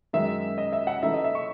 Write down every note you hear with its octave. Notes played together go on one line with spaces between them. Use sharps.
F#2 D#3 G#3 E5
D#5
E5
F#5
C#3 E3 A3 D#4 E5
D#5
E5
C#6